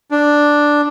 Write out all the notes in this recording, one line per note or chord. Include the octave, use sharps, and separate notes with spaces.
D4